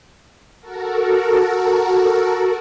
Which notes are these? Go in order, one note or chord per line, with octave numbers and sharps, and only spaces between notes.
F#4 A4 A#4